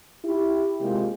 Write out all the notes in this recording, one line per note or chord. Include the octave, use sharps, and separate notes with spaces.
E4 G4
C3 G#3 A#3 F4 G4